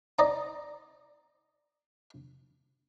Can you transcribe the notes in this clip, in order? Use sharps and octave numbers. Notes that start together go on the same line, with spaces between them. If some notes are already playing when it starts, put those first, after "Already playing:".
D5 D#5 A#5